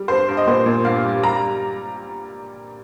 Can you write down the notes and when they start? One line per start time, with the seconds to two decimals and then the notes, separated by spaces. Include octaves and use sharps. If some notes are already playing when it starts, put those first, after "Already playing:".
Already playing: G3
0.08 G2 C5
0.28 G2
0.37 D#5
0.47 A#2 C5
0.66 A#2
0.85 G2 F5
1.05 G3
1.23 G3 A#5